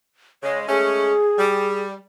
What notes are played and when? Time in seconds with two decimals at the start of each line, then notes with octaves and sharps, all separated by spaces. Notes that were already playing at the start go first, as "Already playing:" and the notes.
0.43 C#3 G#3 C#5
0.69 G#3 A3 C#4 G#4
1.39 G3